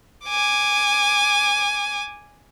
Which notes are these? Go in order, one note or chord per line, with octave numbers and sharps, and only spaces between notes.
G#5 D6